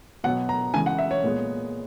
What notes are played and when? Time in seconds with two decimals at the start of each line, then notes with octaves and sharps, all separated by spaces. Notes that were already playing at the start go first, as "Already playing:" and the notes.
0.24 B2 F#3 B3 F#5
0.49 A#5
0.74 C#3 E3 G#3 G#5
0.86 F#5
0.98 E5
1.11 C#5
1.24 A#2 G#3 B3